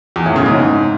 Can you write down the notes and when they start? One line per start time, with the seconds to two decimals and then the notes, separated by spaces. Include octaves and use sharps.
0.16 E2
0.26 A2
0.36 C#3
0.46 G#2